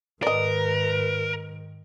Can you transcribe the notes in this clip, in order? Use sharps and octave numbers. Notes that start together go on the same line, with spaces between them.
G#2 D#3 A#4 B4 D5 D#5